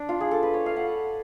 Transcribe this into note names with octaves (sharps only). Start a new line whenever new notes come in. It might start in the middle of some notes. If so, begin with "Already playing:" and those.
Already playing: D4
F4
G#4
A4
B4
C#5
F5
F#5